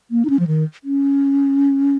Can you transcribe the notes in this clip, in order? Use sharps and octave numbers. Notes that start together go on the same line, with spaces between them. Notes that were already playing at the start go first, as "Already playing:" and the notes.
A#3
D#4
C#4
F3
D#3
C#4